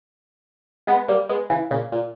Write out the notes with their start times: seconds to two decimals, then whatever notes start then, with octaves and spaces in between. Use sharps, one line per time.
0.87 G#3 B3
1.08 G3 A#3
1.29 G#3 B3
1.50 C#3 E3
1.71 A#2 C#3
1.92 A#2